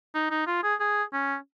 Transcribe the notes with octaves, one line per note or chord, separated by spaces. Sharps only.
D#4
D#4
F4
G#4
G#4
C#4